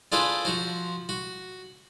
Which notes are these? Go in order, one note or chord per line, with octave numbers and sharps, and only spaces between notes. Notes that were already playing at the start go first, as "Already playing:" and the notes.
D4 F4 G#4 A4 B4 C5
F3 F#4 C5
F#4